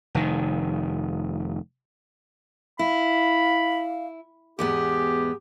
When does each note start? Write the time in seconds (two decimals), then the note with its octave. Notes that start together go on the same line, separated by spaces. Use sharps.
0.15 F1 D#3
2.79 E4 F5 B5
4.59 E2 G#2 B3 G4 G#4